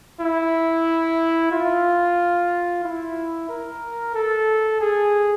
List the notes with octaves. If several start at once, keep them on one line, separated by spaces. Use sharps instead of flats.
E4
F4
E4
A#4
A4
G#4